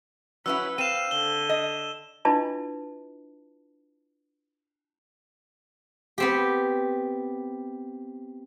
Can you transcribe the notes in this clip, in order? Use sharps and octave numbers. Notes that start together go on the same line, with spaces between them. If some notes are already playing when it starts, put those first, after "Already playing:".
F#3 C#4 E4 B4 F#5 E6
C4 F5 D#7 E7
D3 G7
D#5
D4 E4 F4 B4 D#5 A5
B3 C4 G4